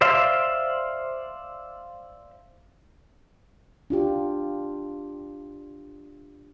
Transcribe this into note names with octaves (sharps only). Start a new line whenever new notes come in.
C5 D5 E5 F5 C6
D4 F4 G4